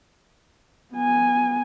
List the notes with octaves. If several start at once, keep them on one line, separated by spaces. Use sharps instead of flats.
B3 G#5